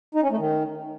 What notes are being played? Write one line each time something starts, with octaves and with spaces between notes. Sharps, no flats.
D#4
C#4
A3
D#3